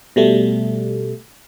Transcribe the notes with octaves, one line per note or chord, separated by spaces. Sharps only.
B2 G3 A3